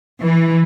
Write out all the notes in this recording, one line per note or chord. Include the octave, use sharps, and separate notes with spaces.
E3